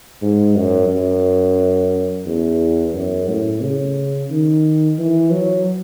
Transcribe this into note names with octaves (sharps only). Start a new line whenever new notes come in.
G#2
F#2
F#2
E2
F#2
A2
C#3
D#3
E3
F#3